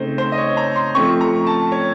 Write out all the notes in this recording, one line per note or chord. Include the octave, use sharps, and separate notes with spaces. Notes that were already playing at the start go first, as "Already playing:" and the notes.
Already playing: C#3 A3 C4 D#4 C5
C5
D#5
C#5
A#5
C6
F3 A3 C4 C#6
A#5
A5
C#5